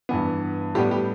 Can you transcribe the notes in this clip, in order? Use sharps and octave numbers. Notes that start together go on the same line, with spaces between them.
G2 E3 B3
A2 G3 B3 G4
G4